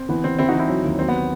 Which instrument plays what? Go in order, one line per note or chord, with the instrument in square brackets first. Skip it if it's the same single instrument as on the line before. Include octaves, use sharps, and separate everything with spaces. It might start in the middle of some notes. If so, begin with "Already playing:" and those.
Already playing: [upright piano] C4
[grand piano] E3 [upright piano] B3
[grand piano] E3 [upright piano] C4
[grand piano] E3 [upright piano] C4 E4
[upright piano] D#4 F#4
[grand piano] E3
[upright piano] C4 E4
[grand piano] F#3
D#2
[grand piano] F#3 [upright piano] C4
[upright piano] B3